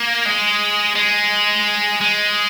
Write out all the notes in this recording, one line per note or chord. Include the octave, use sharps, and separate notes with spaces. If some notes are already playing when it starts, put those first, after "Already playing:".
Already playing: A#3
G#3
G#3
G#3